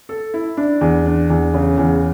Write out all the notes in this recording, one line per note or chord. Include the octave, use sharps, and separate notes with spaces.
A4
E4
D4
E2
D4
E2
C#3
E2